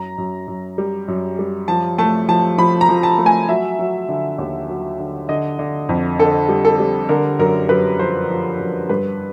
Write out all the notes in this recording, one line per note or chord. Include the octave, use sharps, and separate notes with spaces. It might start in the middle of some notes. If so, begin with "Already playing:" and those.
Already playing: F#2 A#5
F#2
F#2
G3
F#2
G3
F3 A5
A3 A5
F3 A5
F3 B5
A#5
F3
A5
A3
G#5
F#3 E5
F#3
D3
D#2
F#3
D3
D3 D#5
D3
F2
D3 A4
G3
A4
G3
D3 A#4
F#2 A#4
F#2 B4
F3 C5
F3
F#2
G2 B4